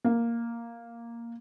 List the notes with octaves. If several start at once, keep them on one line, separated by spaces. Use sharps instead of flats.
A#3